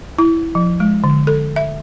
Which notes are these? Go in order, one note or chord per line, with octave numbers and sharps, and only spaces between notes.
E4
F3
G#3
D3
A4
E5